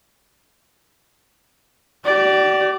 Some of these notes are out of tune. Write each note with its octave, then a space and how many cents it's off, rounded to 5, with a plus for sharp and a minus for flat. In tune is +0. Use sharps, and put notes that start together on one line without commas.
G4 -45 D5 +0